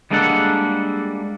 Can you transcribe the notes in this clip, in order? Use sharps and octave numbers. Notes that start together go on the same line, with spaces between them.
G3 G#3 A#3 D4 A4 F#5